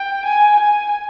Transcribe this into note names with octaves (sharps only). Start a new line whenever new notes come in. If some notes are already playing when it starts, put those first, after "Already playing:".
Already playing: G5
G#5
G#5